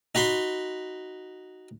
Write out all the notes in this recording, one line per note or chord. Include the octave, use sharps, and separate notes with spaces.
D#4 F#4 B5 C6